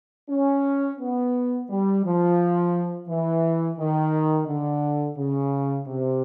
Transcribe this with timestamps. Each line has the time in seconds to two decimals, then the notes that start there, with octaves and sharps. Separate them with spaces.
0.30 C#4
1.00 B3
1.70 G3
2.04 F3
3.09 E3
3.79 D#3
4.47 D3
5.18 C#3
5.88 C3